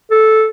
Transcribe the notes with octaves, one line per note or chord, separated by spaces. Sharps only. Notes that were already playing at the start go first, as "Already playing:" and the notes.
A4